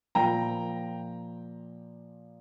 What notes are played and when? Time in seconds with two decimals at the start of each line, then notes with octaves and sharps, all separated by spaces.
0.15 A#2 F3 A#3 G5 A#5